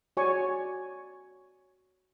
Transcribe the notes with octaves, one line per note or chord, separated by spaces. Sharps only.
F#4 C#5 D5 G#5 C#6